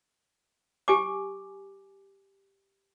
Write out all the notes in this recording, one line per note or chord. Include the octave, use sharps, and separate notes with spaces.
G4 G#5 D6